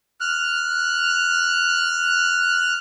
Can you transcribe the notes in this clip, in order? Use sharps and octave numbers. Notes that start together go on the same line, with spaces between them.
F6 F#6